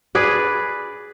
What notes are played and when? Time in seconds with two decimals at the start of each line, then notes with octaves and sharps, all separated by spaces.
0.15 G#4 B4 D5